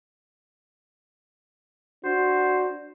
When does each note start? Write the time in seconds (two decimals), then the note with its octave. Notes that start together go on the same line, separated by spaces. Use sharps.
2.05 D4 F#4 C5